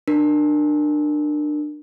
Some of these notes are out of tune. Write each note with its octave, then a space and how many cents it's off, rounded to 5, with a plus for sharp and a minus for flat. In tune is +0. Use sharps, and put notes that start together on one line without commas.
D4 +25 A#4 +0